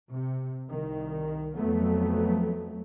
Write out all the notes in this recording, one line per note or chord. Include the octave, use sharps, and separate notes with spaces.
C3
C2 D#3
F2 F#3 A3 B3